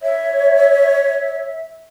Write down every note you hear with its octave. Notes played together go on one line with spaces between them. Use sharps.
C#5 E5